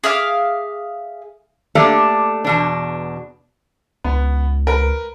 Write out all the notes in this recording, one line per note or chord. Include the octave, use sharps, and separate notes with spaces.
G#4 E5 F5 D6
A3 A#3 D4 G4 A4
E2 B2 D4
C#2 B3
A#4 B4